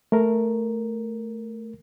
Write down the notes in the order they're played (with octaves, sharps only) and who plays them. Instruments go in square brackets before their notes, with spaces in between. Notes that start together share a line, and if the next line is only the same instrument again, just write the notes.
[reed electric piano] A3 A#4